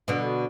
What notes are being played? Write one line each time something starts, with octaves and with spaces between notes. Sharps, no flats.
B2 D3